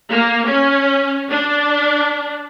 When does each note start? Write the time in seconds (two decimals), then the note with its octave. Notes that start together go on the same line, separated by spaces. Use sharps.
0.12 A#3
0.48 C#4
1.31 D4